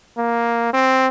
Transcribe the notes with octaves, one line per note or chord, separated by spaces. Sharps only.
A#3
C4